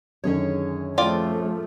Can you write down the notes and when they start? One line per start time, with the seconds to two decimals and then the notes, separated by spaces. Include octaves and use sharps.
0.24 F#2 D3 D#3 C#4 G#4 C#5
0.98 F3 A3 C4 F4 D5